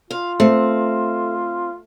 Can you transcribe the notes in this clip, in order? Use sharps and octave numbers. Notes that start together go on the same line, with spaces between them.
F4 F5
A3 C4